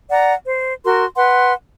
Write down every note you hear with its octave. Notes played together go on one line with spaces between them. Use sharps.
D5 F#5 A#5
C5
F#4 A#4 C6
B4 F#5 C6